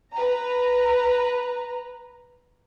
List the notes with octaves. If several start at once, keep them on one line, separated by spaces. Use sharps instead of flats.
B4 A#5